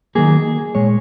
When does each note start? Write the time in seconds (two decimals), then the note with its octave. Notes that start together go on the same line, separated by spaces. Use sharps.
0.15 D#3 F#3 A#3 G#4
0.75 A#2 G#3 C#5